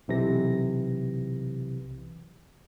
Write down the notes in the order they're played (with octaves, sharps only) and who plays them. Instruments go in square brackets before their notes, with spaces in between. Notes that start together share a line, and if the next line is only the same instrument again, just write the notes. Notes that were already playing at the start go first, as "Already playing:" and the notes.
[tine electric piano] B1 C3 E3 A#6